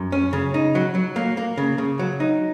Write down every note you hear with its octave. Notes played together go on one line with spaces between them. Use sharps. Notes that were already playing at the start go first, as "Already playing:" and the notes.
Already playing: F#2
C#4
C#3
D#4
F#3
F#3
A#3
A#3
C#3
C#3
F#3
D#4